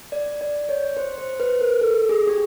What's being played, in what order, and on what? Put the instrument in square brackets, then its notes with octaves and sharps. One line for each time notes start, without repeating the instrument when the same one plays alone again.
[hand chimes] D5
D5
C#5
C5
C5
B4
A#4
A4
G#4
G4